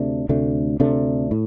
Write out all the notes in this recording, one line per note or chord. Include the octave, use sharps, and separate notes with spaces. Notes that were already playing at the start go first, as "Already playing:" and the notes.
Already playing: D2 C3 A3 D4
D2 C3 A3 D4
D2 C3 A3 D4
A2